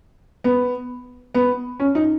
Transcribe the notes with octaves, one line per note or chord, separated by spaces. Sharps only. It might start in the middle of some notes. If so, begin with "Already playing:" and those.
B3
B3
C#4
D#4